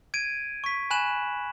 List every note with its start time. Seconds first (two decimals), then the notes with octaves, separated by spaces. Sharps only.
0.14 G#6 D7 D#7
0.64 C#6 B6
0.90 G#5 B5 F#6 E7 F#7